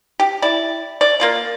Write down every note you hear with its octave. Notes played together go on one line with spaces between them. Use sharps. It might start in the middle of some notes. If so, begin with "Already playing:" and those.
G4
E4 D5
D5
A#3 F4 D5